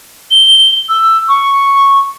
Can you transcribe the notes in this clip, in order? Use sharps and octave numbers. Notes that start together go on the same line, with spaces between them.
G7
E6
C#6